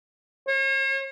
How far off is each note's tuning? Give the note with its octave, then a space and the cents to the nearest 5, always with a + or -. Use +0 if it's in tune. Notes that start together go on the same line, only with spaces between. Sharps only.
C#5 -45